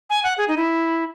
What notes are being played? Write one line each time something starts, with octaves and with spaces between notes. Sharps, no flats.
G#5
F#5
G#4
D#4
E4